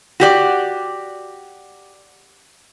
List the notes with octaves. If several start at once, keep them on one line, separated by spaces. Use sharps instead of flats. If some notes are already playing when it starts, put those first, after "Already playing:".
F#4 G4 D5